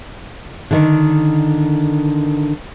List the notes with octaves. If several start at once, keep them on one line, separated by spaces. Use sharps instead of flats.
D3 D#3